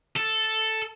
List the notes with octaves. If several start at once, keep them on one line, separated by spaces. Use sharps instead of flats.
A4